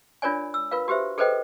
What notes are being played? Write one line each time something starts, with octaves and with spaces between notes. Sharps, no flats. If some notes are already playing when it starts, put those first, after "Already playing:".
D4 F4 A#4 C#5 D5 G#5
E6
F4 A#4 B4 F5
F#4 G4 B4 C5 E5
G#4 A4 B4 C5 D#5 G5